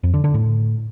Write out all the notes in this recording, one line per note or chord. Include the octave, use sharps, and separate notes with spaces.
F2
D3
D3
A2